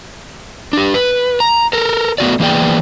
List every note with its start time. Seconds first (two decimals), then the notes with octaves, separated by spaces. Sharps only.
0.73 D4 G4
0.94 B4
1.40 A#5
1.73 A4 A#4
2.18 A3 B3 F#4 D5
2.40 E3 A#3 B3 G#4 D5 G5